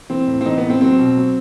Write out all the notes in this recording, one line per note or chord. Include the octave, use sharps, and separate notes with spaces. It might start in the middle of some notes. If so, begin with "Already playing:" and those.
E3 C4
A2
C4
E3 D#4
B3
A2
C4
F#3 C4
B2
F#3